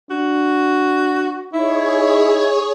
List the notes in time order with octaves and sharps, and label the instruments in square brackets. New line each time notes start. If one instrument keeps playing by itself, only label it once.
[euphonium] D4 [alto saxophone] F#4
[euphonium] D#4 [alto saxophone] E4 [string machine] G#4 C#5